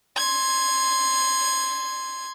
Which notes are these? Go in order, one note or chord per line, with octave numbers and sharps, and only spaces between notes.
C6 G#6